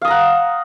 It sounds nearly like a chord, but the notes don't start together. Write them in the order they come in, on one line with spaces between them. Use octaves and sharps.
F5 D#6 A#5 F#5